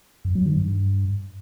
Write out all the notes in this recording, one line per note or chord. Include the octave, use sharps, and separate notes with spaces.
F#2
F#3
D#3
G2